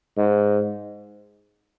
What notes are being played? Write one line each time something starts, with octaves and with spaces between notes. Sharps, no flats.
G#2